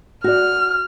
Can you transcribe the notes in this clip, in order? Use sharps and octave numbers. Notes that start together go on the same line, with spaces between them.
F#4 D5 F6